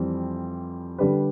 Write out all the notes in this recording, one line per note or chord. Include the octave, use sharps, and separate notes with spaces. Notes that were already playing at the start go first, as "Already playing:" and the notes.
Already playing: F2 E3 G3 C4
D3 G3 D4 G4 B4